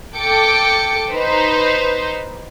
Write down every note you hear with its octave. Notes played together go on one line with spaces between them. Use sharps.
A4 G5 D6 C#7
D#4 B4 C5